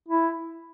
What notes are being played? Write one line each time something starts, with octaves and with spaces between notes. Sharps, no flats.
E4